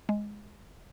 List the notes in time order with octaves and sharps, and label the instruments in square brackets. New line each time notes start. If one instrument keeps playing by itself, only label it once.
[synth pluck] G#3